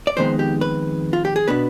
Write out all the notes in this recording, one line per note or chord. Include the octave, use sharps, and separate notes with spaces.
D5
F2 D#3 G#3 B3 D#4 C5
G4
B4
F4
G4
G#4
B2 B3 D4 B4